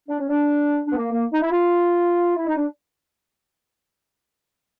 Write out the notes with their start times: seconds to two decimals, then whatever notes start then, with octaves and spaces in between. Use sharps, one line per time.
0.08 D4
0.19 C#4
0.29 D4
0.85 D4
0.92 B3
0.97 A#3
1.10 A#3
1.32 D#4
1.42 E4
1.51 F4
2.36 E4
2.47 D#4
2.56 D4